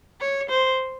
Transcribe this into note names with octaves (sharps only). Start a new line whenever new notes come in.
C#5
C5